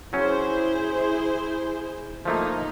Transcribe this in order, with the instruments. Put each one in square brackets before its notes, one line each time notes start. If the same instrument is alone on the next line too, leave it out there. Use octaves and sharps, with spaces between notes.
[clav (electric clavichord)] F#3 C#4 [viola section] E4 G#4 C5
[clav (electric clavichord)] F3 A3 A#3 [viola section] D#4